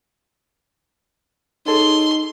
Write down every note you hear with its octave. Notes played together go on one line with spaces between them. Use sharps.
D#4 G#4 A4 C#5 C6